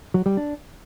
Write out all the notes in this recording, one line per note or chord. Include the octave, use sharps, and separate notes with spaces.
F#3
G3
D4